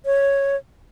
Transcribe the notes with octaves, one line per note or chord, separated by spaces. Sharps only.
C#5